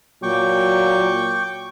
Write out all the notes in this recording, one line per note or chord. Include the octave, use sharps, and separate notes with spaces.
A#2 F#3 G5 C#6 D6